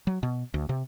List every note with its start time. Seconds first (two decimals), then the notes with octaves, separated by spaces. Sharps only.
0.07 F#3
0.23 B2
0.54 D2
0.69 C3